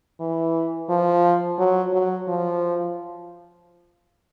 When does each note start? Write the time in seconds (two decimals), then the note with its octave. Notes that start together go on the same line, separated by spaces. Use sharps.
0.20 E3
0.89 F3
1.59 F#3
1.93 F#3
2.28 F3